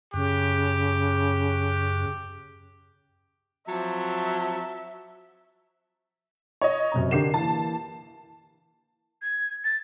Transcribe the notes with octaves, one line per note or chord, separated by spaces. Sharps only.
F#2 C#3 G4
F3 F#3 C4 E5 A5
C#5 D#5
F#2 C3 A#5
D3 G4 A#4 C7 E7
E3 A#3 A5
G#6
A6